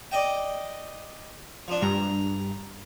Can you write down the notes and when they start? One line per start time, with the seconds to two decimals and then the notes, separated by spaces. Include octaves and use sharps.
0.12 D5 D#5 G5
1.68 F3 D4
1.82 G2 A#5